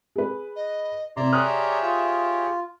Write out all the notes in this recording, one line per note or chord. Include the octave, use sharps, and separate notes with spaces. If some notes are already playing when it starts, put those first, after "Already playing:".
G#4 B4
D#5
C3 C4 E4 D5 E5 A#5 C6
G4 G#4 C#5 D#6 F6 F#6
F4